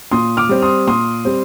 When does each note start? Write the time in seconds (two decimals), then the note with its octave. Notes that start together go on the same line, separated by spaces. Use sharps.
0.11 A#2 C6 D#6
0.37 D6 F6
0.49 G3 C4
0.62 C6 D#6
0.87 A#2 C6 D#6
1.25 G3 C4